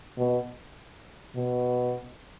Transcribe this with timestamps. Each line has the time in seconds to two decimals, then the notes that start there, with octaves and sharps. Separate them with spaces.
0.17 B2
1.36 B2